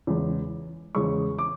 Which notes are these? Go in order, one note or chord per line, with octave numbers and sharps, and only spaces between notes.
E2 C#3 G#3
E2 C#3 G#3 C#6
D6